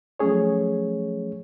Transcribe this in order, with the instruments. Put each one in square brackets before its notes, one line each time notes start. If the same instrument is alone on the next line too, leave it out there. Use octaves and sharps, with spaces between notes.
[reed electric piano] F3 F#3 A3 C#4 G#4 C#5